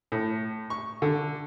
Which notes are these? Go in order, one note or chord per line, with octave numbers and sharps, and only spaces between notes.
A2
C#6
D3